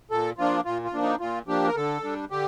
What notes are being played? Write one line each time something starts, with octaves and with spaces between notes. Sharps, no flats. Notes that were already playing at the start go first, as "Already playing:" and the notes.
A#2 A4
F3 A#3 D4 F4
A#2 F4
F4
F3 A#3 D4
D#4
A#2 F4
F3 A#3 D4 G4
A#4
D3 A4
G3 D4
D3 G4